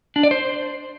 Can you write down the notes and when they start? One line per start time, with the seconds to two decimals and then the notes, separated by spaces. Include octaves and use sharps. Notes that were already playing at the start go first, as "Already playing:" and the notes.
0.16 D4
0.23 D5
0.31 C5